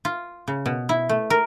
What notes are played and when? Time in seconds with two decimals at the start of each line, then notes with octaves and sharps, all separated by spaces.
0.05 F4
0.48 C#3
0.66 B2
0.89 E4
1.09 A3
1.30 A#4